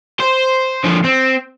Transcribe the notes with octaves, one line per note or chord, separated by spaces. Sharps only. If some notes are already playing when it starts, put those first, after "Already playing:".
C5
D3 F3
C4